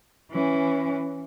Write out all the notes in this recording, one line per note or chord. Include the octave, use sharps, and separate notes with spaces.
E3 C#4